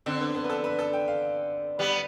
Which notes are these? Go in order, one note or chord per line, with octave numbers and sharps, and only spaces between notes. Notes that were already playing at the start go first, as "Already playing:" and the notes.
D3 C4
B3
B3
B4
A4
B4
A4
G5
F5
G3 B3